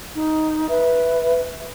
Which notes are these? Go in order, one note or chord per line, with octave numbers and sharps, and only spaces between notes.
D#4
B4 E5